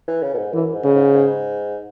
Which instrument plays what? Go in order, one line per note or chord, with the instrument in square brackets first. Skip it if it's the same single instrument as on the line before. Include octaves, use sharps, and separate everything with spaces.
[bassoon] E3
C#3
B2
G#2
[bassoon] F#2 [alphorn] E3
[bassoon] G#2
[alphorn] C#3
[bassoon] G#2
G#2